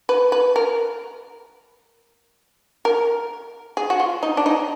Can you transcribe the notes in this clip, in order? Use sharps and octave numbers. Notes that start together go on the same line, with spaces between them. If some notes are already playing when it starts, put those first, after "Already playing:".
B4
B4
A#4
A#4
G#4
F#4
F4
D#4
D4
D#4